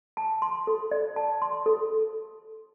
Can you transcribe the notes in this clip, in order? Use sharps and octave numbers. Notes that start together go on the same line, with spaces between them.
A5
C6
A4
D5
A5
C6
A4